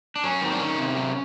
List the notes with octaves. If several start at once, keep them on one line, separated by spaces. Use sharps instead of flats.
D4
F#3 C#4
D#3 C4
D4
D#3 C#4
C3
F#3